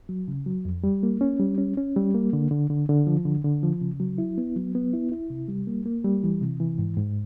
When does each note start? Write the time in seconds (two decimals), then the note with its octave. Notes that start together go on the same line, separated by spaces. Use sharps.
0.09 F#3
0.28 C#3
0.46 F#3
0.65 F2
0.84 G3
1.03 A#3
1.21 C#4
1.40 G3
1.58 C#4
1.77 C#4
1.96 G3
2.15 A#3
2.33 D3
2.51 D3
2.70 D3
2.89 D3
3.07 F3
3.26 D3
3.45 D3
3.63 F3
3.81 C#3
4.00 F#3
4.18 E4
4.38 B3
4.56 F#3
4.75 B3
4.93 E4
5.12 E4
5.30 C3
5.48 G3
5.67 A#3
5.86 A#3
6.05 G3
6.24 E3
6.41 C3
6.60 E3
6.79 G#2
6.97 G#2